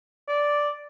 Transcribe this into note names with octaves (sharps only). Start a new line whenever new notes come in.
D5